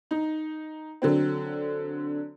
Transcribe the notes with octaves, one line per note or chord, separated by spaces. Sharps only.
D#4
D3 F#3 C4